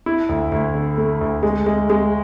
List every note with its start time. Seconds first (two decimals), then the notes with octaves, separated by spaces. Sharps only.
0.06 E4
0.29 D2
0.52 D2
0.75 D3
0.97 A3
1.21 D2
1.43 G#3
1.66 G#3
1.90 G#3